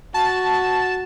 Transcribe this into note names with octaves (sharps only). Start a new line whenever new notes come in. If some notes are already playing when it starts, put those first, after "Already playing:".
F#4 A5